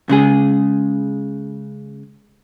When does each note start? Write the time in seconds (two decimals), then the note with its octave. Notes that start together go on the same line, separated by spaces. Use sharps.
0.09 C#3 G#3 G#4